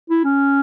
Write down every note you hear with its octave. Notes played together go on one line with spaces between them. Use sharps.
E4
C#4